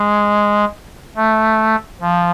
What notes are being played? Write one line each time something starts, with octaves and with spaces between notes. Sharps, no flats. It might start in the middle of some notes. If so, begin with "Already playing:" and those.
Already playing: G#3
A3
F3